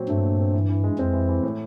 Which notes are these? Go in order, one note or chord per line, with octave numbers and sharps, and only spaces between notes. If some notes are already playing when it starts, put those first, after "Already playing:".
Already playing: A#2 F#3 C4
G2 A3
A#2
C4
E3
E3
G#3
F2 C4
E3
E3
A2